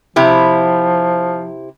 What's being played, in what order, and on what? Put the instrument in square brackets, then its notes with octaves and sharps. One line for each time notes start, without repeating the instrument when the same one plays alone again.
[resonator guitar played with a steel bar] C3 E4 G4 [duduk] F3